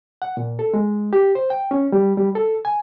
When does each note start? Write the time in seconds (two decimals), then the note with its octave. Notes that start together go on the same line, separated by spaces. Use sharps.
0.22 F#5
0.37 A#2
0.59 A4
0.74 G#3
1.13 G4
1.35 C5
1.50 G5
1.71 C#4
1.92 G3
2.17 G3
2.35 A4
2.65 G#5